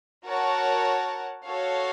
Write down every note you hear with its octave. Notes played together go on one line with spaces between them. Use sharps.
F#4 A#4 C#5 F#5 A5
F#4 A4 C#5 F5